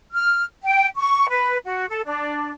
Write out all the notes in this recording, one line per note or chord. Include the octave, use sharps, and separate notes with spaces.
F6
G5
C#6
B4
F#4
A4
D4